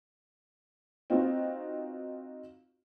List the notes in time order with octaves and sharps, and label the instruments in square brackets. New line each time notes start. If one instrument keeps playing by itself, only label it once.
[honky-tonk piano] C4 D#4 F4 F#4 B4